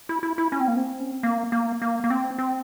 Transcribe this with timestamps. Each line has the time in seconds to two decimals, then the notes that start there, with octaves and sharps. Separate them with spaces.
0.09 E4
0.23 E4
0.38 E4
0.52 C#4
0.60 C4
0.68 A#3
0.76 C4
1.00 C#4
1.12 C4
1.23 A#3
1.52 A#3
1.82 A#3
2.04 A#3
2.10 C4
2.38 C4